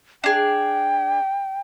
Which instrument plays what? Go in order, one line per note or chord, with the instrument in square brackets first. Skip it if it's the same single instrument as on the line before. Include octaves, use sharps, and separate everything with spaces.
[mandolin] D4 G#4 [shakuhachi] G5